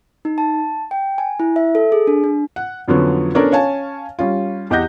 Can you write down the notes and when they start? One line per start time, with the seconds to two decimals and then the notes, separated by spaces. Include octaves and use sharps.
0.25 D#4
0.38 A5
0.91 G5
1.18 G#5
1.40 E4
1.56 E5
1.75 A4
1.92 G#4
2.07 D4
2.24 D4
2.56 F#5
2.88 F2 D3 F3 F#3 B3 C#4
3.35 B3 C#4 D4 A4 A#4 D5
3.52 C#4 C#5 F5 G#5 A5
4.19 G3 C#4 F4
4.70 E2 G4 D#5 F#5 G6 A#6